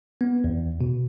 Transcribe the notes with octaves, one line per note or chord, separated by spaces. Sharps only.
B3
E2
B2